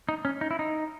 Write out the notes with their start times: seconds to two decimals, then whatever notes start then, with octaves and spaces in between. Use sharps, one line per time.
0.09 D#4
0.25 C#4
0.41 D#4
0.51 E4
0.59 D#4